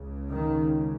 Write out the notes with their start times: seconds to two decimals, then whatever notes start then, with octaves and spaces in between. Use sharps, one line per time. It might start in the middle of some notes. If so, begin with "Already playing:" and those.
Already playing: C#2 C#3
0.30 D#3